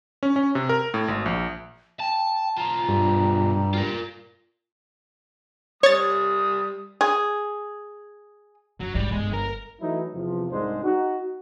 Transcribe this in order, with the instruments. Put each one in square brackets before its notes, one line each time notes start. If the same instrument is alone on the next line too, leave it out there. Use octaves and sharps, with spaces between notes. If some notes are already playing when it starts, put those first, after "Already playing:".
[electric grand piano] C#4
C#4
C3
A#4
A2
G#1
A#1
[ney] G5 [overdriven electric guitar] A5
[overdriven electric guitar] B1 F4 [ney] A#5
[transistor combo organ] G2
[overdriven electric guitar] F4 A#4
[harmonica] G3 D#6 [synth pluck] C#5 A6
[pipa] G#4
[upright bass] F#2 [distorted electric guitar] F#3
[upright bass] G#2 C3 [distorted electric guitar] G3
[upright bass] G1 [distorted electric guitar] G#3
[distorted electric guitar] A#4
[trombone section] E3 F#3 A3 D#4 E4
E2 C3 F3
C2 G#2 D#3 G#3 D4 C5
D#4 F#4